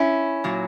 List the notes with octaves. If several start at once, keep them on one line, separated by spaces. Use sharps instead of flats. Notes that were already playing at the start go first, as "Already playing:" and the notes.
Already playing: C#4 E4
A#2 F#3